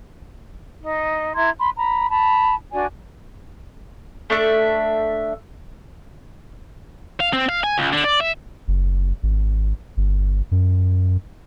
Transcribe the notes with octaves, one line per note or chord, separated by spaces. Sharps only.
D#4
E4 A#5 C6 G#6
B5 C6
A#5 B5
A5 B5
D4 F#4 D5 G#5
A3 D4 E5
F5
C4
F5
G#5
C#2
D3
D5
E5
F#1
G#1
G1
F#2